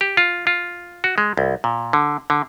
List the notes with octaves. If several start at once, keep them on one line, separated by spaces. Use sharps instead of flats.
G4
F4
F4
F#4
G#3
C2
A#2
D3
D3